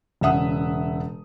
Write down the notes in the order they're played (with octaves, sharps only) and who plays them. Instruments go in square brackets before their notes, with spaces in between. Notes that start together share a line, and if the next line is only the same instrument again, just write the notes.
[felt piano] E1 C#3 E5 F#5 D#6